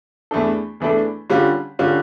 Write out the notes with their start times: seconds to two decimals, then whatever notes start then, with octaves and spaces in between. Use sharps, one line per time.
0.31 E2 E3 A3 D4 A4
0.80 E2 E3 A3 D4 A4
1.30 D3 G3 C#4 F4
1.79 D3 G3 C#4 F4